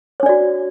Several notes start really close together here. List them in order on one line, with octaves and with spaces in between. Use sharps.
C#5 D4 D5 F#4